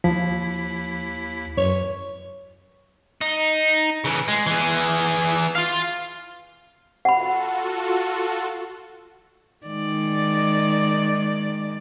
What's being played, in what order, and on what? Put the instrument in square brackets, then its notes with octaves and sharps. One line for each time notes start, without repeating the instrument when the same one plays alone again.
[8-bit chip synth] D#2 E4 B6 [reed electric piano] F3
[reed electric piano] F#2 [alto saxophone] C#5
[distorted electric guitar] D#4
C#3 E3
G#3
E3 G#4
F4 F5
[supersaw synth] F4 F#4 A4 [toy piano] F#5 B5
[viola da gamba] D#3 G#3 D5